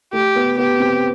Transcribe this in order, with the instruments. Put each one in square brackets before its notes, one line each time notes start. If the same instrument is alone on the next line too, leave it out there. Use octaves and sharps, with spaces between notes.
[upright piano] A3 [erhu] G4
[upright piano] B3
[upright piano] B3 [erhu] G4
[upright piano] C4